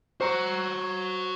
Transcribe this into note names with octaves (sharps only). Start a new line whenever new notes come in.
F#4 C5 A#5 C#6